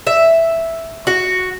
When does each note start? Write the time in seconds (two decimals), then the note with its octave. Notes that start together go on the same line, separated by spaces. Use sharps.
0.07 E5
1.07 F#4